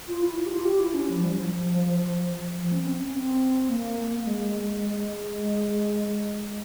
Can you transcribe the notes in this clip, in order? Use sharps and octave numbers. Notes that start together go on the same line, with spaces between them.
F4
E4
E4
G4
F4
G4
E4
C#4
F3
G3
F3
F3
C#4
C4
C#4
C4
A#3
G#3